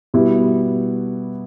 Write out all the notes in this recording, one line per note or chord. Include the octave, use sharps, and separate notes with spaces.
B2 G3 B3 E4